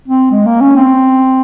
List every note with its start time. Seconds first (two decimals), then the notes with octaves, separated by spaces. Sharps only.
0.08 C4
0.31 G#3
0.46 A#3
0.61 C#4
0.76 C4